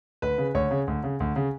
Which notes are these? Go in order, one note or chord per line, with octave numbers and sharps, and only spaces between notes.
D2 B4
C#3
D2 C#5
C#3
D2
C#3
D2
C#3